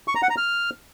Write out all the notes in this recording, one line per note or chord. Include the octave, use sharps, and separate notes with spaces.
C#6
A#5
F#5
A#5
F6